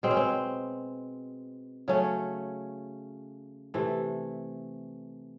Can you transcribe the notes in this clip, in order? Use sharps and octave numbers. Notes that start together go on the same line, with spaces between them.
B2 G#3 C4
C#4
C4
C#3 F#3 A3 C#4
C3 E3 A3